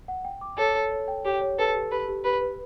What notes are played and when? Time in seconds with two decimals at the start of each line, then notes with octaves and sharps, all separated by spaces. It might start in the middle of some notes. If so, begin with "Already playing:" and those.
0.08 F#5
0.25 G5
0.41 D6
0.58 A4 C#5
0.75 C#5
0.92 C#5
1.08 G5
1.25 G4 C#5
1.41 C#5
1.58 A4 B4
1.75 G4
1.91 G4 B4
2.09 G4
2.24 G4 B4
2.41 B4